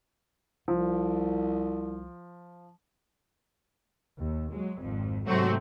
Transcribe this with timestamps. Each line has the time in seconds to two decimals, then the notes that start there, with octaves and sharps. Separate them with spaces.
0.68 C2 F3
4.18 D#2
4.52 F#3 G#3
4.81 G#1 F2
5.27 G#2 C3 F#3 A3 C4 F#4